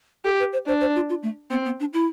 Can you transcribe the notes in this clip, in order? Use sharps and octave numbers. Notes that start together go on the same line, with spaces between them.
G4 A4
B4
C5
D4 C5
C5
F4
F4
A3
B3 C4
B3
D4
E4